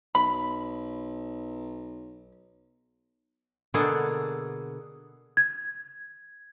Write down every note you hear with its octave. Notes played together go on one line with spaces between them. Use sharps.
B1 B5
B2 D3 A#3 B3 G#4 A4
G#6